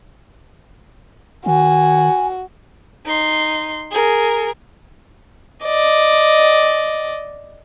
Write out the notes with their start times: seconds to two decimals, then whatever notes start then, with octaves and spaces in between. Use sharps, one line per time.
1.46 D#3 F#4 G#5
3.05 D#4 C6
3.91 G#4 A#4
5.65 D5 D#5